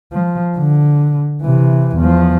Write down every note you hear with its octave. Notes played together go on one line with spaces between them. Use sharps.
F3
D3
C3 E3
E2 F3